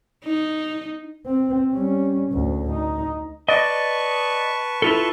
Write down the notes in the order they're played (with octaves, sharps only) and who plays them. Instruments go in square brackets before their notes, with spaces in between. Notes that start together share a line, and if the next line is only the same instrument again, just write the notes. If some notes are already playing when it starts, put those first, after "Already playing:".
[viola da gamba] D#4
[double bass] C4
G3 C#4
D2 G#2
D#4
[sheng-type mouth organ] B4 A5 C#6 [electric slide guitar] D5 D#5
[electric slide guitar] E4 F4 A4